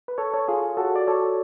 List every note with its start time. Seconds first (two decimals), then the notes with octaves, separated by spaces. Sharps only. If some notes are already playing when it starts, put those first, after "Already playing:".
0.08 B4
0.18 A4 C#5
0.34 A4 C#5
0.48 F4 G#4
0.77 F#4 A4
0.96 D5
1.07 A4 C#5